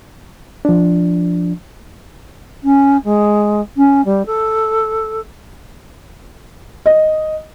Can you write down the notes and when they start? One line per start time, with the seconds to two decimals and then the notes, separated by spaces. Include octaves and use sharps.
0.65 F3 D4
2.63 C#4
3.04 G#3
3.77 C#4
4.05 G3
4.26 A4
6.86 D#5